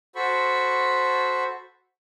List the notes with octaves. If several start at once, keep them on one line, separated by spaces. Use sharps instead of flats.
F#4 A4 C5 B5 C#6